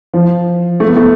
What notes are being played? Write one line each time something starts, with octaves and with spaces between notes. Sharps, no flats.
F3
A3
B3
A3